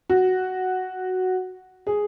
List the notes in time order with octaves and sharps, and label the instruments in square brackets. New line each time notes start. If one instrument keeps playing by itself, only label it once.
[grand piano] F#4
G#4